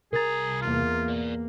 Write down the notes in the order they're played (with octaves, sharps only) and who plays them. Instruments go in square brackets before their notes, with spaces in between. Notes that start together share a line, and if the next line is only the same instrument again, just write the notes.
[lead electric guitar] C2 A#5 [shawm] G#4 [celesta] A#4 A6
[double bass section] E2 A#3 [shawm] F4
[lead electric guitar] A#4 D5